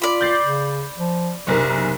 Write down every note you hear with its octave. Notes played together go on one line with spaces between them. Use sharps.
F4 D5 B5
G6 A6 C7
C#3
F3
F#1 B1 C3 A#4